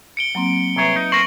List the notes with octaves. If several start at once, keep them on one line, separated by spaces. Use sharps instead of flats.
C#7 D7 G7
F#3 A#3 C4
C2 G#4 B4 C#5 E5 A#5
D#4
A#4 C5 C#6 F#7